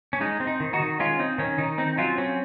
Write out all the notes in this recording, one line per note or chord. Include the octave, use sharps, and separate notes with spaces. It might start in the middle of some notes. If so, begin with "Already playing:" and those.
C#4
G#3 D#4
C4
D#4
D#3
D#4 F#4
D#3
G#3 C#4 F4
C4 D#4
D#3 C#4
D#3 D#4
C4 D#4
F#3 C#4 F4
C4 C#4